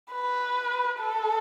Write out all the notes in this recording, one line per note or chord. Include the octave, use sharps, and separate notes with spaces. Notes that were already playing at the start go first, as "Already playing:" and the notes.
B4
A4